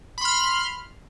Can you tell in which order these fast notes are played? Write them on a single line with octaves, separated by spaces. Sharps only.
B5 C6 F6